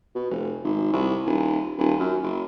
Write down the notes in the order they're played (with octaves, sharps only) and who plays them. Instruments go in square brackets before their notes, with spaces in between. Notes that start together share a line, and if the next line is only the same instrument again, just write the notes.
[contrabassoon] B2
F1
G#1
C2
D#1
D#1
F#2
F#1